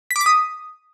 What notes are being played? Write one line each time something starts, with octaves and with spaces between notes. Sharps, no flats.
B6
D6
B6
D#6